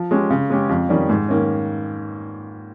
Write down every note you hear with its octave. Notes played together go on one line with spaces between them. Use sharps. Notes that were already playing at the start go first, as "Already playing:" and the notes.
Already playing: F3
G#3 C#4 G4
C#3
G#3 C#4 G4
F2
D#3 G3 C#4
G#2
D#3 A#3 C#4